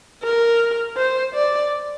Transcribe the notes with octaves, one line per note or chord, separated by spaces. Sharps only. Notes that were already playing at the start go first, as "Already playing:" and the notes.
A#4
C5
D5